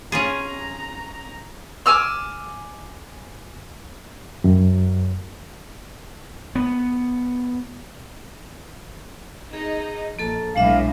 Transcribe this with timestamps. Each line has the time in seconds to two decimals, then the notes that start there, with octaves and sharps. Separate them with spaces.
0.12 C#4 F4 G#4 A#5
1.86 G#5 D6 E6 F6
4.44 F#2
6.55 B3
9.53 D#4 G#4
10.19 A#1 A#3 A4 A5
10.56 B1 A2 G#3 D4 E5 F5